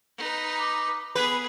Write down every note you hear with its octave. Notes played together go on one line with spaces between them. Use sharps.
D#4 B4
D6
B3 G#4 B4 B5